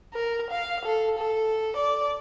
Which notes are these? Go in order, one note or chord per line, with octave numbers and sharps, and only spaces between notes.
A#4
F5
A4
A4
D5